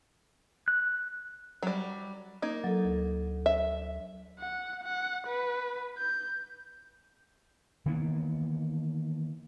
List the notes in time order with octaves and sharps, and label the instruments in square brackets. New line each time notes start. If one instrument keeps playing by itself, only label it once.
[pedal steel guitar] F#6
[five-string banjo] F#3 G3
[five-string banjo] A#3 D#4 [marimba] G#6
[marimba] F#3 A4
D2
[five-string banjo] E5
[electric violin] F#5
F#5
B4
G6
[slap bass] D#3 E3 A#3 B3